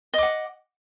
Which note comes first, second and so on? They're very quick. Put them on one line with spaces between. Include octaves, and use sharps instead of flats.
D#5 D6 F#5